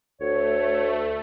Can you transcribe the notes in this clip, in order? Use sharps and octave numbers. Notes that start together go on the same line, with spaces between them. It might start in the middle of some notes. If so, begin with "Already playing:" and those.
D2 A3 C#5